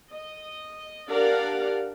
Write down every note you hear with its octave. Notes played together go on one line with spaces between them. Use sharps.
D#5
D4 G4 A#4 D5 F5 F#5